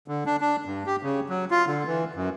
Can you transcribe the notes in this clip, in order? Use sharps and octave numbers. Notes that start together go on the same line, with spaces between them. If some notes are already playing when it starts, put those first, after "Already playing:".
D3
D4
D4
G2
G4
C#3
F#3
F4
D3
E3
F#2